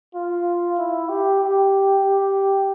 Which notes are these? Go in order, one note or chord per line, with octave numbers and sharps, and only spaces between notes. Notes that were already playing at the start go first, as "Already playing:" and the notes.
F4
E4
G4
G4
G4